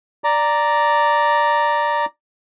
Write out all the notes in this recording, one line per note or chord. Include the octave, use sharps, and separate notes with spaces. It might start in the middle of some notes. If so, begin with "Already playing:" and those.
D5 A#5